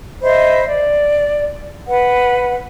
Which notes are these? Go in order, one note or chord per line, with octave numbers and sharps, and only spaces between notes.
C5 D#5 E5 B5
D5
B4 F#5